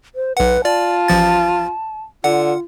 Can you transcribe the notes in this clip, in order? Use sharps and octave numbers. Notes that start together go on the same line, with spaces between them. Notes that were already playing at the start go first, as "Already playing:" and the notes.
C5
B1 B4 F#5
F4 D5 A5
A1 F3 A6
D3 F4 F#5